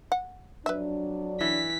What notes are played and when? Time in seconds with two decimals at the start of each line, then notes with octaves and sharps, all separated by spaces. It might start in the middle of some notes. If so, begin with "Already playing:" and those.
0.12 F#5
0.66 F2 F#3 D4 B4 E5
1.41 E3 B6